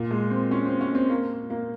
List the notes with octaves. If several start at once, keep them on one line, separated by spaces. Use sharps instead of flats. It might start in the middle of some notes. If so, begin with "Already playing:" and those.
Already playing: A#2
G#3
C4
C#4
C4
C#4
C4
A#3
A#3